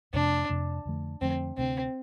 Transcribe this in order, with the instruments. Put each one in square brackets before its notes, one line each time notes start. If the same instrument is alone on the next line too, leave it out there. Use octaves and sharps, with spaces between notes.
[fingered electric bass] F2 C3 A3 [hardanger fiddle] D4
[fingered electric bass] F2 C3 A3
F2 D3 F3 A3
[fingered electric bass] F2 D3 F3 A3 [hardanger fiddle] C4
[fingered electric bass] D2 C3 A3 D4 [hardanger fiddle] C4